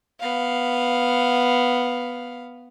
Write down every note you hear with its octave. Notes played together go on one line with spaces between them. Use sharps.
B3 F5